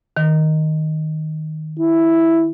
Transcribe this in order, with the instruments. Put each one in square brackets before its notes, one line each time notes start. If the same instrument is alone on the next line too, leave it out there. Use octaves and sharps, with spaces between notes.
[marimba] D#3
[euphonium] E4